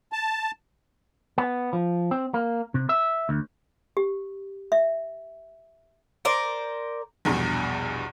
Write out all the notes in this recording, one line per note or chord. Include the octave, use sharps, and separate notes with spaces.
A5
B3
F3
C4
A#3
C3
E5
D2
G4
E5
A#4 C5 D5
A#1 E2 G2 B2